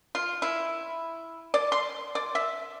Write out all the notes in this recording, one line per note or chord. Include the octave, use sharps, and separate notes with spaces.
F4
E4
D5
C6
D5
E5